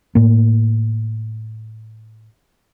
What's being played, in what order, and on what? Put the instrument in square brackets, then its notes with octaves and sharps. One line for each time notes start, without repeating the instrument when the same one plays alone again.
[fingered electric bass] A2 A#3